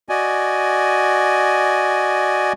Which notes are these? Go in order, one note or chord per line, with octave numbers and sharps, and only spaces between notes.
F#4 D5 D#5 G#5